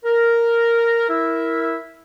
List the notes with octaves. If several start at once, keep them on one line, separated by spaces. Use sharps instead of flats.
A#4
E4 A#4 E5